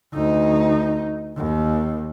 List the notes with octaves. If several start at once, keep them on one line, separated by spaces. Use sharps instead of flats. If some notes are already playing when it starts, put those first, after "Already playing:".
D2 D#4
D#2